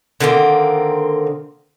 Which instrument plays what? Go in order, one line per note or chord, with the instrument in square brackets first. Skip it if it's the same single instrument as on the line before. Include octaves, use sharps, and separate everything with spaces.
[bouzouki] D3 D#3 A#3 C4